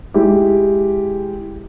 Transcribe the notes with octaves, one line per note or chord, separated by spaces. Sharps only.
G#3 E4 G4